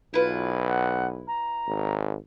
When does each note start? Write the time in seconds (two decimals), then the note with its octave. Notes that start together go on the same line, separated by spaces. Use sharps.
0.14 B1 E4 F4 B4
0.67 F#5
1.27 A#5
1.67 G#1